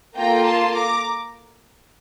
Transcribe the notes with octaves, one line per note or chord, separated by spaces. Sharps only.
A#3 F4 A4 G5 A#5
A5 C6
A#5 D6